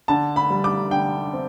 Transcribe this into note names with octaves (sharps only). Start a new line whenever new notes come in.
D3 A5
B5
G3
D6
D3 G5
C4